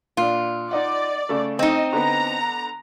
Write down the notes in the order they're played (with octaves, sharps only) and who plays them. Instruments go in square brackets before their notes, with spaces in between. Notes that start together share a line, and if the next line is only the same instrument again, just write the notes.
[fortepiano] A#2 D4 [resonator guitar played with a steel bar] F4
[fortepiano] D#4 D#5 F#5 [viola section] D5
[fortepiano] C#3 A3
[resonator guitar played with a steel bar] C4 D#4 [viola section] D#5
[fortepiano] D3 B3 [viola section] A#5